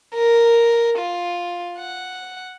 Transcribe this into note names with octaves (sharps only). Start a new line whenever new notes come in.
A#4
F4
F#5